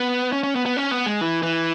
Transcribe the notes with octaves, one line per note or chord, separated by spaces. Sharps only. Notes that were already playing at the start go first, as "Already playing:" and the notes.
Already playing: B3
C#4
C#4
B3
B3
C#4
B3
G#3
E3
E3